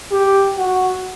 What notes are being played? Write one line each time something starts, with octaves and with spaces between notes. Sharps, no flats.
G4
F#4